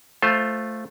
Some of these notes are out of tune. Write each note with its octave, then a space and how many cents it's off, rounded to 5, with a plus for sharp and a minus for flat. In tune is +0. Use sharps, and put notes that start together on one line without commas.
A3 +0 F4 +0 C5 +10